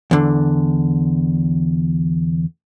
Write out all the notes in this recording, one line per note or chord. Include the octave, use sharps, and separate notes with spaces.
E2 D3